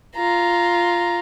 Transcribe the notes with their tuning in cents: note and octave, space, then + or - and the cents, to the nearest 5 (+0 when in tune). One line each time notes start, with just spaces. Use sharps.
F4 -5 A#5 +5